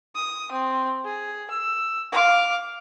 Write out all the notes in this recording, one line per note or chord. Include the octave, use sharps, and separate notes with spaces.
D#6
C4
G#4
E6
F5 D6